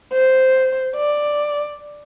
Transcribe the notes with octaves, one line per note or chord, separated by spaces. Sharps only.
C5
D5